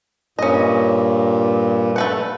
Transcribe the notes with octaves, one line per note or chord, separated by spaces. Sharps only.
G2 A#2 C#4 D#5
A3 B4 F#5